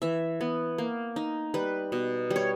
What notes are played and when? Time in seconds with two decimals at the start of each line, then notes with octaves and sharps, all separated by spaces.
0.02 E3 E5
0.41 B3
0.78 A#3
1.16 D#4
1.54 G3 B4
1.92 B2
2.31 G3
2.36 C#5